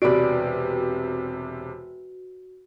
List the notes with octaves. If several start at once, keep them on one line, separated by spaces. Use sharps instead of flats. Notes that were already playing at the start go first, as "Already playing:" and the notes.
E1 C3 F#4 B4 D5 D7